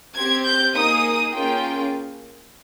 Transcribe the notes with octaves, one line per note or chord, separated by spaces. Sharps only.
C4 G4 G#6
G6
A#3 D#4 G#4 D#6
A#3 C#4 F4 G#4 G5